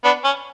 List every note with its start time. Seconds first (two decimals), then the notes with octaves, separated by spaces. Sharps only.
0.04 B3 D4
0.25 C#4